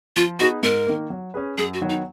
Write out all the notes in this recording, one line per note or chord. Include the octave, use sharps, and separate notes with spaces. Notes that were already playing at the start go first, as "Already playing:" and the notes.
F3 F4
B3 D#4 F#4 G#4 B4
G#2 A#4
D#3 A#3
F#3
C#4 G#4 B4
F#2 G#4
F#4
D#3 F#3 B3
D#4